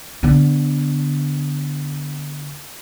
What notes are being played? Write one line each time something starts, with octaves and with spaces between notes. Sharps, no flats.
D3 B3